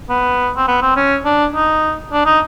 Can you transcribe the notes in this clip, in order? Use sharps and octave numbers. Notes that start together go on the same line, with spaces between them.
B3
C4
B3
C4
C#4
D4
D#4
D4
D#4